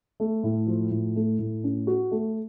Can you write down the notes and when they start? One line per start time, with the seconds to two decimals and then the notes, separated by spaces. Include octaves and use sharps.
0.20 A3
0.43 A2
0.67 F3
0.91 A2
1.16 A3
1.39 A2
1.64 C#4
1.87 F#4
2.11 A3